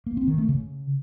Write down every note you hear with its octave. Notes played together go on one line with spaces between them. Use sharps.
A#3
C4
D#3
A3
C#3